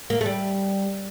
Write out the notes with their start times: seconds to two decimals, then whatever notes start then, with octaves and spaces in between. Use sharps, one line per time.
0.10 A#3
0.21 A3
0.26 G3